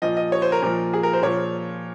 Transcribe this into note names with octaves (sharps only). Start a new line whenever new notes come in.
A#2 F3 D#5
D#5
C#5
C5
A#4
A#2 F3
G#4
A#4
C5
A#2 F3 C#5